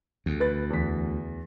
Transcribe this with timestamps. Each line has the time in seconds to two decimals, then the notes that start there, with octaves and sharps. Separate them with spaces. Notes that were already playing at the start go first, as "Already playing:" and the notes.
0.26 D2
0.40 B4 A6
0.70 E2 B6